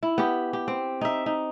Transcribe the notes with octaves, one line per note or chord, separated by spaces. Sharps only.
E4
B3 G4
G4
C4
D#4 E5
D#4